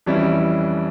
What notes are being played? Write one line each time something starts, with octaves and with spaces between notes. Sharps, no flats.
F2 E3 G3 C#4 E4